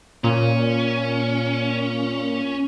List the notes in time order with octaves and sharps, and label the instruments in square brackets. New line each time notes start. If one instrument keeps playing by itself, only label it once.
[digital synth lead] A#2 [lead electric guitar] C#4